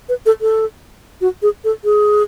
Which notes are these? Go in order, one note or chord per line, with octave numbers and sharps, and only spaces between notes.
B4
A4
A4
F#4
G#4
A4
G#4